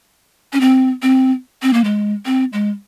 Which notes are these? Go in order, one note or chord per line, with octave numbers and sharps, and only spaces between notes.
C#4
C4
C4
C4
A#3
G#3
C4
G#3